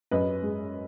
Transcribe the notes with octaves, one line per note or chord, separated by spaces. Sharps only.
F#2 B4 D#5
G#3